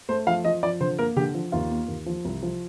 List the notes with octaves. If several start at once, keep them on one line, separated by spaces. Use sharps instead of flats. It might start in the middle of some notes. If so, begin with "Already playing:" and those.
A3 C5
F3 F5
F3 D#5
F3 D5
D3 C5
A#3 A#4
D3 G4
F3
D#2 F4
A#3
D#2
F3
C2
F3